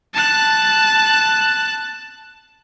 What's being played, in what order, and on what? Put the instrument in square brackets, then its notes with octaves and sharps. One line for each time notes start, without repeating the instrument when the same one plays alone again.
[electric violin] A5 F#6